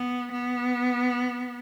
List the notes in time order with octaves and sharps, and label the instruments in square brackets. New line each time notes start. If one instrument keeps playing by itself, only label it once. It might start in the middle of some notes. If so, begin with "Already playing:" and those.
Already playing: [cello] B3
B3